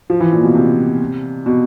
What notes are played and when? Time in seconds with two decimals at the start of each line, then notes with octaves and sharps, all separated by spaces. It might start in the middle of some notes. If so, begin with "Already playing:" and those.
0.10 F3
0.20 E3
0.33 A#2
0.43 B2
0.55 C3
1.46 B2